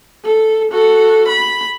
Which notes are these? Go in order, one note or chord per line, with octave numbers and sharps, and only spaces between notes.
A4
F#4 A4
B5